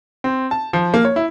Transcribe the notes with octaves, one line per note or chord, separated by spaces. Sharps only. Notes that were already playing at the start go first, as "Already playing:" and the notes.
C4
A5
F3
A#3
C#5
E4